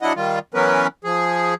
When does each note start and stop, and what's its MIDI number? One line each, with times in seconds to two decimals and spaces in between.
0.01 0.13 54
0.01 0.13 62
0.01 0.13 64
0.01 0.13 75
0.01 0.13 78
0.16 0.39 51
0.16 0.39 55
0.16 0.39 65
0.54 0.87 52
0.54 0.87 54
0.54 0.87 59
0.54 0.87 61
0.54 0.87 70
0.54 0.87 71
1.04 1.54 53
1.04 1.54 68